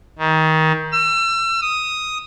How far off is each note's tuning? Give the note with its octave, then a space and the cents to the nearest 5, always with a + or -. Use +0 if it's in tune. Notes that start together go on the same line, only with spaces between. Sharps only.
D#3 +25
E6 +35
D#6 +5